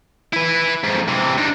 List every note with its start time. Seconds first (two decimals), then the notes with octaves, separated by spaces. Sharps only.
0.33 E4 B4
0.84 F2 G#2
1.08 C3 E3
1.38 D4 D#4